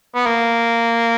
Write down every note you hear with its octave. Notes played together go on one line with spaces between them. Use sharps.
B3
A#3